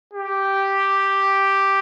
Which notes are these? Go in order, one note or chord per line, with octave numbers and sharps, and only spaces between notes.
G4